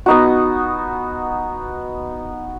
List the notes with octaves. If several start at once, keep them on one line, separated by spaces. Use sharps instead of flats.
B3 D#4 F#4